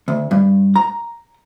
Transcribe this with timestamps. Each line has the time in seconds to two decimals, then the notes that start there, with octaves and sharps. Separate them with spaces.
0.08 D2
0.31 G2
0.76 A#5